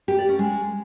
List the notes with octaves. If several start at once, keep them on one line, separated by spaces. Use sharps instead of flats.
G4
D5
C#4
G#3